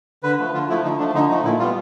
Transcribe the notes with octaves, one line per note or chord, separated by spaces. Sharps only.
D3 B4
F3 A3
D3 F4
F3 A3 E4
D3 D#4
F3 A3 D4
D3 D#4
F3 A3 D#4
A#2 E4
G3 B3 F4